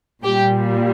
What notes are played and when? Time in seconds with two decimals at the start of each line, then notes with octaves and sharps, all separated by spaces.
0.23 A#2 G3 G4